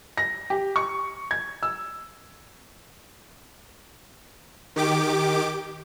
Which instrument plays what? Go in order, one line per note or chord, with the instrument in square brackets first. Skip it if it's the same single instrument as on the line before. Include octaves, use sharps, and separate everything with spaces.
[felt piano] A#6
G4
C#6
G#6
E6
[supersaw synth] D#3 G4 D6